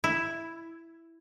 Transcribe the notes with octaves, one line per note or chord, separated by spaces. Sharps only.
E4